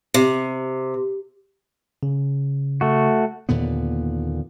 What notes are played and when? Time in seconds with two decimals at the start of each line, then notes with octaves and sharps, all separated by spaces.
0.14 C3
2.03 C#3
2.81 A3 F#4
3.49 D#2 A#2 D3 B3